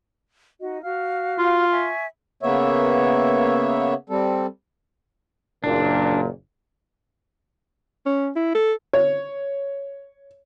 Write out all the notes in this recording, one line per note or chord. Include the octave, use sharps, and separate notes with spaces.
D#4 F#4 D#5
F#4 F5 F6
F4
E5 G#5 C#6
C#3 A#3 B3 C#5 E5
G3 C4 A4
F#1 A#2 D4
C#4
E4
A4
C#5